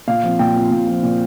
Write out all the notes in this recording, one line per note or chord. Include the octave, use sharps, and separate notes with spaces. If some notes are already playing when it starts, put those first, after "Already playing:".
A#2 F5
F3 C4
A#2 G5
F3 C4
A#2
F3 C4
A#2